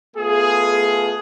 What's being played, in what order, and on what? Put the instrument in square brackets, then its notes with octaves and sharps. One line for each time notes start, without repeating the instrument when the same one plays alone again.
[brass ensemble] A3 B3 F4 G#4